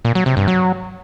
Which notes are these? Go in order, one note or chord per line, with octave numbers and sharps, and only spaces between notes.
A#2
F#3
C3
G2
F#3